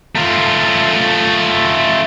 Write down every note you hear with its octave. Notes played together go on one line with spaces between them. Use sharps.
A3 F4